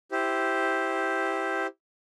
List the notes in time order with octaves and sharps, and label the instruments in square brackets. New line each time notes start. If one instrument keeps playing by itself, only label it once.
[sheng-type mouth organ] E4 G4 C5